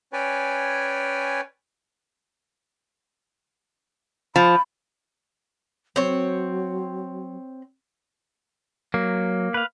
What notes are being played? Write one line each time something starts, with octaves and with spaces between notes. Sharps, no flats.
C#4 B4 C#5 D5 G5 G#5
F3 B5
F#3 C4 C#5
F#3 A#3
B4 F5